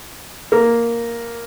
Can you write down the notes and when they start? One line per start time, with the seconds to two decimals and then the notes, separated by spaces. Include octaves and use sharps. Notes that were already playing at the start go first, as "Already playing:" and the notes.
0.52 A#3